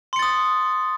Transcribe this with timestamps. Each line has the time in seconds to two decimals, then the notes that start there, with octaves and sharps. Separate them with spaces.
0.13 C6
0.16 C#7
0.19 A6
0.22 D#6